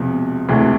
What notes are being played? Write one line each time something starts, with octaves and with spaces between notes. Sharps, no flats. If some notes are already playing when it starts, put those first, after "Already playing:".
Already playing: E1 E2 C3 F3
E1 D2 C3 E3